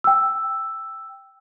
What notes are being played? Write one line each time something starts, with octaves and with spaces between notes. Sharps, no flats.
G5 E6